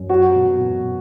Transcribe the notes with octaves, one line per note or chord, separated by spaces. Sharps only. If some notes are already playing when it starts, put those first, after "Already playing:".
Already playing: F#2
F#3 F#4
B2
B2